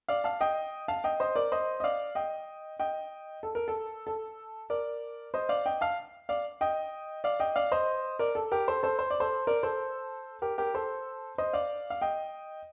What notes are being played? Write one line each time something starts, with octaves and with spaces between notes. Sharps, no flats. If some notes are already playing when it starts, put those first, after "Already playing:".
D5 F5
F5 A5
D#5 G5
F5 A5
D#5 G5
C5 D#5
A#4 D5
C5 D#5
D#5
D5 F5
D#5 G5
D#5 G5
A4
A#4
A4
A4
A#4 D5
C5 D#5
D5 F5
D#5 G5
F5 A5
D5 F5
D#5 G5
D5 F5
D#5 G5
D5 F5
C5 D#5
A#4 D5
A4
G4 A#4
A4 C5
A4 C5
C5
D5
A4 C5
A#4 D5
A4 C5
G4 A#4
G4 A#4
A4 C5
C5 D#5
D5 F5
F5
D#5 G5